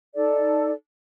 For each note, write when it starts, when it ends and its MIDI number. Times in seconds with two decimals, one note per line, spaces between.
0.15 0.72 63
0.15 0.72 69
0.15 0.72 74